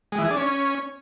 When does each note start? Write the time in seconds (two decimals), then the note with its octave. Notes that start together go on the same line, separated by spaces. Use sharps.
0.12 G#3
0.18 E3
0.24 G#4
0.31 D4
0.37 C#4